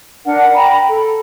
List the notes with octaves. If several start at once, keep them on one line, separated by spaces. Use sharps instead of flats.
D4 A#4 F#5
G5 A#5 B5
A4